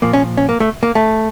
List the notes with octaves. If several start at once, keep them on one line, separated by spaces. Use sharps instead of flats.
A#2 F3 A#3
C#4
C#4
A#3
A3
A#3
A3